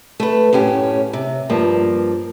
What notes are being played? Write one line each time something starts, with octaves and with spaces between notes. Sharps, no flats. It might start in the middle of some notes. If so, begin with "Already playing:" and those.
A3 B4
F#2 A2 C#4 G4
C3
G2 F3 A#3